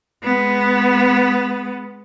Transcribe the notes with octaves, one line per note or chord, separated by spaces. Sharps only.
G#3 B3